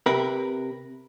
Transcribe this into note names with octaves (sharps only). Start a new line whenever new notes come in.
C3 A#4 B4 B5